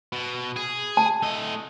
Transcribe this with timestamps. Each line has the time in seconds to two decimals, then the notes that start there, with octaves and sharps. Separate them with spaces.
0.13 B2
0.56 G#4
0.97 A5
1.23 A3 D#5